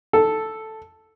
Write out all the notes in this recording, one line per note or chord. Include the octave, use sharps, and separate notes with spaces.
A4